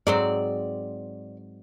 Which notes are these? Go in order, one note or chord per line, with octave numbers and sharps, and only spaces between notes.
G#2 F#3 C4 D5